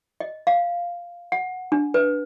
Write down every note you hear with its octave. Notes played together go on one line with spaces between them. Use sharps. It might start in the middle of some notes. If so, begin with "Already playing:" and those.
D#5
F5
F#5
D4
B4